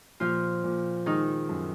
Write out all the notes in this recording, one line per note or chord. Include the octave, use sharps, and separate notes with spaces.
A#2 F3 F4
A#2
D#3 G#3 D#4
F#2